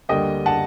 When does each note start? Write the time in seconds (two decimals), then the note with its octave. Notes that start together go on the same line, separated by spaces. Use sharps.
0.09 D2 D3 G3 A#3 D#5 G5
0.46 F#5 A5